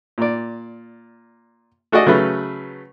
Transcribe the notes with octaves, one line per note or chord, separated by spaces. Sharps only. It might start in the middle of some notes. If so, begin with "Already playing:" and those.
A#2 D5
A3 F#4 G#4 D5 D#5
C#3 F#3 A3 B4